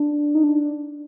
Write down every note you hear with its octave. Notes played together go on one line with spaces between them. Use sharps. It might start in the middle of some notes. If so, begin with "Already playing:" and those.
Already playing: D4
D#4
D4